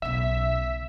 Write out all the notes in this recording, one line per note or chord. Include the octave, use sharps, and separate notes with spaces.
B1 C#3 E5